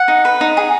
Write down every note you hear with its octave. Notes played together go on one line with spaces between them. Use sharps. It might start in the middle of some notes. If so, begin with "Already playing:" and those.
Already playing: F#5
D#4
B4
D#4
G#4